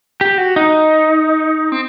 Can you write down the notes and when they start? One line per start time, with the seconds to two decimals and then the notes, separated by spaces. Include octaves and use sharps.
0.21 G4
0.38 F#4
0.56 D#4
1.72 C4